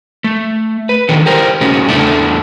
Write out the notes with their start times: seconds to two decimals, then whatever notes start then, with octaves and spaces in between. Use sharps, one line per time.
0.24 A3
0.89 B4
1.09 D3 D#3 F#3 A4
1.26 G4 A#4 C5
1.61 C#3 A3 C#4 F#4
1.88 E2 E3 A3 D4 E4 A4